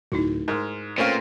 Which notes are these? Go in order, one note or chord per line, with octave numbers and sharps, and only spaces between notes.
D1 D#4 E4 F#4
G#2 A#4 C6 F6
A#2 A3 C4 C#4 B4 F5